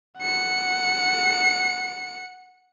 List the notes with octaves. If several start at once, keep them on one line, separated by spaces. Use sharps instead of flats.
F#5 C#7